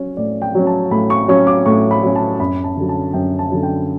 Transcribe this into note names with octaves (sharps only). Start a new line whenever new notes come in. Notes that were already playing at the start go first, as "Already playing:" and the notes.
Already playing: F#3 C#4 C#5
A2 D5
G5
F#3 C#4
A5
A2 B5
C#6
F#3 C#4 C#6
D6
A2 C#6
B5
F#3 C#4
A5
F#2 B5
A5
D3 F#3
A5
F#2 G5
A5
D3 F#3
G5